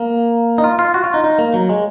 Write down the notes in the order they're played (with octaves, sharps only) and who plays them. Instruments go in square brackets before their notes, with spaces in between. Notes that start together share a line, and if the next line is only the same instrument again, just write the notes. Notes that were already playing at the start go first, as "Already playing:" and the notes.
Already playing: [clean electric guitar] A#3
D#4
F4
F4
F#4
F4
D#4
D#4
A#3
F#3
G#3